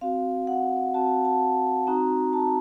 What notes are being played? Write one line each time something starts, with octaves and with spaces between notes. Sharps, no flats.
C4 F#4 F5
F#5
C4 F#4 A5
A5
C4 D#4 F#4 A#5
A5